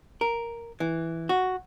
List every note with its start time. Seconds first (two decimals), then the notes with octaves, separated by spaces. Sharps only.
0.21 A#4
0.80 E3
1.29 F#4